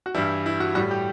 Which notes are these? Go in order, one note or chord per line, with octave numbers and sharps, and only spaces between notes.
F#4
G2 E3 G3 E4
E4
F#4
A2 G3 F#4
G4